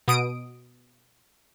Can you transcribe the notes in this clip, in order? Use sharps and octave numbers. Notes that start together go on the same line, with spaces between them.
B2 D#6 D7